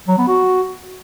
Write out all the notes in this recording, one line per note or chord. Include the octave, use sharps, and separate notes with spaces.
F#3
B3
F#4